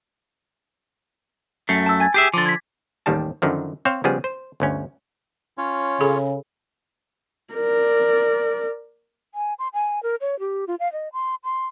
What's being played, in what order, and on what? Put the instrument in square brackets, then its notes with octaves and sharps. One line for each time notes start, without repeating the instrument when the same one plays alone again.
[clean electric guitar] F#2 A3 [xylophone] C7 C#7
[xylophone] A5 E6
G#5 G#6 A6
[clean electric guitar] G4 G#4 E5
[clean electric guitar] D3 F3 [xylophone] D6 A6
[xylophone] G#6 B6
[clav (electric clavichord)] A1 D#2 D#3 G3 A5
F#2 D3 D#3 F3
C4 C5 C#5 F5
C#3 F3 G3 B3 G#4
C5
G1 D2 C#4
[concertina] C#4 F4 C#5
[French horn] C#3 [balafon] G#4 A4 B5
[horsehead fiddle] A#4 D5
[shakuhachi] G#5
C6
G#5
A#4
C#5
G4
F4
F5
D#5
C6
C6